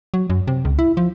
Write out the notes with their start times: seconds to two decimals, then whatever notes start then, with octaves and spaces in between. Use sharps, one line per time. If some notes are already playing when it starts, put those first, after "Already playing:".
0.14 F#3
0.30 F#2
0.48 C3
0.65 C#2
0.79 E4
0.97 F3